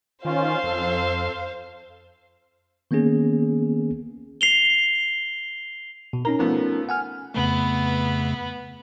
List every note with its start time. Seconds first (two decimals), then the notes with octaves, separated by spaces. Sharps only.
0.25 D#3 C#4 F4 C5 F5
0.64 F2 A4
2.91 D#3 A#3 B3 C#4 G#4
4.41 C7 F7 G7
6.13 B2
6.25 C#4 D#4 A#4 A#5
6.39 F3 A3 B3
6.89 F#5 G#5 F6
7.35 F2 C#3 A3 B3